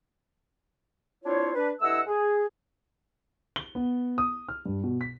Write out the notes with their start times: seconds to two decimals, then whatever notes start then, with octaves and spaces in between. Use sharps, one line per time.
1.24 C4 D4 E4 F4 C5 C#5
1.56 D4 B4
1.81 G2 A3 E4 D#5 F#5 E6
2.07 G#4
3.56 G7
3.75 B3
4.18 D#6
4.48 F6
4.66 G2
4.84 B2
5.01 B6